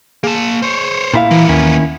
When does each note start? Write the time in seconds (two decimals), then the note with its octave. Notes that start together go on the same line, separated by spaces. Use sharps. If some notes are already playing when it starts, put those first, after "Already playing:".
0.24 A#3 G#4 A5
0.62 C5 C#5
1.14 A#2 E4 F5
1.31 E3 A#3 B3
1.49 D#2 D#3 C#4 E4